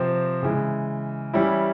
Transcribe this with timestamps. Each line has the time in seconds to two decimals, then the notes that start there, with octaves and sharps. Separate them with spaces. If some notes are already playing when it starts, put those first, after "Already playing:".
Already playing: C3 F3 C4
0.43 C#3 E3 G#3
1.34 E3 G3 C#4 E4